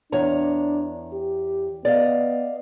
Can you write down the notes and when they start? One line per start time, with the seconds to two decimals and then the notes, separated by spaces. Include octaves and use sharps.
0.12 E2 D4 C#5 A#5
1.13 G4
1.85 B3 D5 D#5 F5